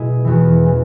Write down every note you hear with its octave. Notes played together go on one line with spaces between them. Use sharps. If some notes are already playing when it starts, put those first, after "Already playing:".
Already playing: B2 G#3 E4 G#4
E2 E3 B3 F#4
E3 C#4